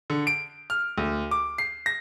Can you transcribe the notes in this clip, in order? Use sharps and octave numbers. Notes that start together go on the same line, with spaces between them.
D3
D7
F6
D2
D6
C7
A#6